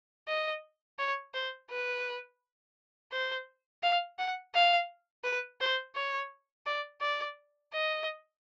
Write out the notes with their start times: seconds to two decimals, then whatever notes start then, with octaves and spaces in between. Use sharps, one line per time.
0.28 D#5
0.99 C#5
1.34 C5
1.70 B4
3.12 C5
3.83 F5
4.19 F#5
4.54 F5
5.24 B4
5.61 C5
5.95 C#5
6.66 D5
7.01 D5
7.73 D#5